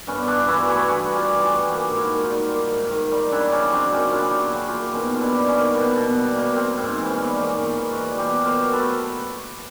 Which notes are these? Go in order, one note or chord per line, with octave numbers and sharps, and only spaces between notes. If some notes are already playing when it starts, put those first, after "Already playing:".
G2 B3 C#4
G2 D4 E4
E3 E4 F#4
A3 F#4 G#4
G2 F#4 G#4
G2
F4 G4
E3
A4
F#4 G#4
A3
A#3 F4 G4
G#2
E4 F#4
D#3
D#4 F4
G3
A#3
G#2
D#3
G3
C#3 D4 E4
C#3 C#4 D#4
F#3 C4 D4
A#3 C#4 D#4
C#3 D4 E4 F4
G#4
C#3 G4
E4 F#4
F#3
F4 G4
A#3
B2 C#4 D#4
B2 F4
D4 E4
G3
C#4 D#4
A#3
B2 B3
B2
G3
A#3
A#3 C4
G#2
C4
E3
B3 C#4
G3
A#3 C#4 D#4
G#2
D#4 F4
E3
E4 F#4
G3
B2 F4 G4
B2
A#4 C5
F#3
A4 B4
A3